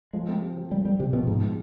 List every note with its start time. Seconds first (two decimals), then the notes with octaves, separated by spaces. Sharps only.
0.13 F3 G#3
0.28 C4
0.42 G4
0.57 F3
0.70 F3 G3
0.85 G3 C4
0.99 C3 G4
1.13 B2 F3
1.27 G#2 B2
1.42 G#3